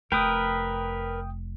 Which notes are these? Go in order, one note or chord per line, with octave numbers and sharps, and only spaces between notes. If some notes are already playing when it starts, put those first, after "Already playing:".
F1 A#4 B4 G5 D#6